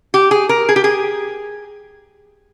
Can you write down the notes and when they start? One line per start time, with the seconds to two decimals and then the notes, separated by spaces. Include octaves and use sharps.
0.14 G4
0.31 G#4
0.49 A#4
0.69 G#4
0.76 G4
0.84 G#4